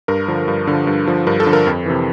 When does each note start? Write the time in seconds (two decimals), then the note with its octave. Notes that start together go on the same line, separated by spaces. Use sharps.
0.08 G2 A#4
0.28 D3 F3
0.48 G2
0.67 D3 F3
0.87 G2
1.07 D3 F3
1.27 G2 A#4
1.40 A4
1.47 D3 F3
1.53 A#4
1.67 F2
1.86 C3 E3